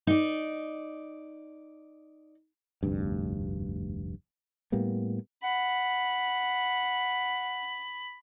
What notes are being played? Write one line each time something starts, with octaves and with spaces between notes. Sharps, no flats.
D#4 D5
F1 D2 G2
A2 G3 A#3 B3
F#5 B5